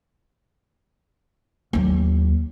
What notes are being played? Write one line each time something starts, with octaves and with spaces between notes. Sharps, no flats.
D#2 F#3